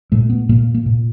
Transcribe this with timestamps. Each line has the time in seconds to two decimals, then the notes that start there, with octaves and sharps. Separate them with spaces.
0.12 A#2 A3
0.30 B3
0.49 A#2 A#3
0.75 A#3
0.86 A#2